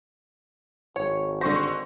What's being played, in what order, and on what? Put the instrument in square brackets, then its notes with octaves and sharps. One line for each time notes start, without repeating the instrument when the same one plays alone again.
[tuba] G#1 [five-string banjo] C#5
[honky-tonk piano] D3 C#6 A#6 [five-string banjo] C5